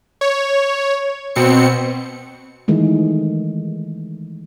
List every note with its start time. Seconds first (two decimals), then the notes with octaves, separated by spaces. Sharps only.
0.21 C#5
1.36 B2 C4 C#7
2.68 D#3 E3 G#3 A3